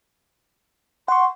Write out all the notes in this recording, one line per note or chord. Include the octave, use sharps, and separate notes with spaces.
F#5 C6 C#6